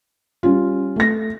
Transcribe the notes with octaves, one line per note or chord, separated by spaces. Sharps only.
G3 C#4 F4
A3 A#6